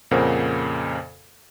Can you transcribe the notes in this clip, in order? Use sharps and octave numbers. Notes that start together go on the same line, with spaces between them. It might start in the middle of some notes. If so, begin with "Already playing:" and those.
F2 A#2 C#3 A#4 C5 F#5